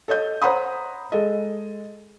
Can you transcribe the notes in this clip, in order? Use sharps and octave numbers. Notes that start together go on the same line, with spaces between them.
A4 C#5 D#5 G6
C5 C#5 F#5 A#5 B5 D#6
G#3 A4 D#5